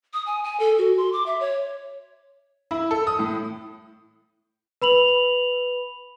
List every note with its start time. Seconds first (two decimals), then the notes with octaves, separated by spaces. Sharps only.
0.13 D#6
0.26 G#5
0.44 G#5
0.60 A4
0.78 F#4
0.97 C6
1.13 D6
1.26 E5
1.40 C#5
2.71 E4
2.91 A4
3.07 D#6
3.19 A2
4.82 B4 B5 F7 F#7